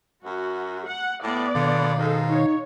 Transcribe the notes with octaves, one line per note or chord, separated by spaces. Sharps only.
F#2 F#4
F#5
A2 B3 D5
B2 D3 D#3 F5
G#2 D#4 A4
D#4 C#5